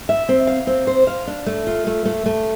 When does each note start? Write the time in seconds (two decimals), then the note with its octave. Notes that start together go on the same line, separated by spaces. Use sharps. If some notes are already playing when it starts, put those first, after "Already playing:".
0.09 E5
0.29 C4
0.47 F5
0.67 C4
0.87 C5
1.07 F5
1.27 D4
1.46 A3
1.67 F4
1.87 A3
2.05 A3
2.26 A3